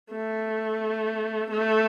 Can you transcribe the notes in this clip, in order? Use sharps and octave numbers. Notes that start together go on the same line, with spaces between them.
A3
A3